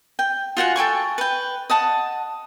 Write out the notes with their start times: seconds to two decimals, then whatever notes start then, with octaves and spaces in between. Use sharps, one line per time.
0.19 G5
0.57 F4 F#4 F#5 G#5
0.76 A4 G5 G#5 C#6
1.18 B4 G5
1.70 D#5 F#5 A5